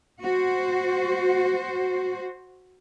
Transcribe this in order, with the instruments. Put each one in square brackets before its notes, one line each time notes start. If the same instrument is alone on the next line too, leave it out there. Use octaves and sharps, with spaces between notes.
[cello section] F#4 C5